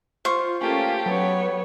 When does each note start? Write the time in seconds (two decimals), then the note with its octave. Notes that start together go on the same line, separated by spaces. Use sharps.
0.25 F4 C5 C#6
0.61 A3 A#3 C#4 F4 G4
1.06 F#3 B3 C#5